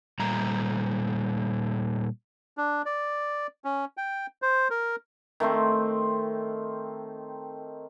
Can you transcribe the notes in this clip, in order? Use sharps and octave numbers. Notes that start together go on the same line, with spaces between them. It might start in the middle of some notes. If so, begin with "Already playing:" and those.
A#2 G3 A3 A#5
D4
D5
C#4
G5
C5
A#4
D#3 A3 C4 C5